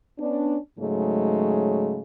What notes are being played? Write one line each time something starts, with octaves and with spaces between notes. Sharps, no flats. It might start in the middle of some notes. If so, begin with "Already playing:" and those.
B3 C#4 D4
G#2 C#3 F#3 G#3 A3